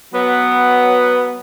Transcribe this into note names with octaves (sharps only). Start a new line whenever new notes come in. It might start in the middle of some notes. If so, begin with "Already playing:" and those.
F#3 B3